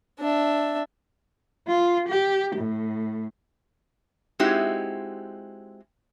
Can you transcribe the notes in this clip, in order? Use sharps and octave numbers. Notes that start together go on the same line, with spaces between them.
D4 E5
F4
G4
A2
G#3 C4 D#4 E4 F#4 G4